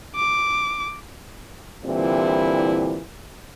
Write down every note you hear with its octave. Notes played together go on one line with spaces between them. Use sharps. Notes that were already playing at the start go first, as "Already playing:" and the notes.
D6
A#2 D3 E3 G3 C4 E4